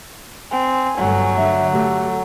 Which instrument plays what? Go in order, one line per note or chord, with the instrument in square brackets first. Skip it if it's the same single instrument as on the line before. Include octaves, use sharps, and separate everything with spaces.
[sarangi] C4 [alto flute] G#5
[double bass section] G1 G2 A3 [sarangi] F#3
[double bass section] D3 [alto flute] E5
[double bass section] A3 [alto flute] G4